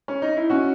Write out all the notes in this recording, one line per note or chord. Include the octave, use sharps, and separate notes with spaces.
C#4
D#4
E4
C#4 F#4